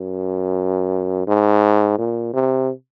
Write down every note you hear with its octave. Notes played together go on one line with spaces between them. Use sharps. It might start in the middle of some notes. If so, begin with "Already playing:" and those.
Already playing: F#2
G#2
A#2
C3